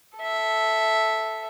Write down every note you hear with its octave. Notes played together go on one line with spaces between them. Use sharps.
A4 E5